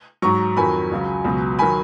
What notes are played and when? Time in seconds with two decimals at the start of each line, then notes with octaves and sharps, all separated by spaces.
0.22 G#2 F#3 A#5 C#6
0.57 F2 D#3 F#3 G#5 B5
0.91 C#2 C#3 F#3
1.25 C#2 B2 F#3
1.59 D#3 F#3 G#5 B5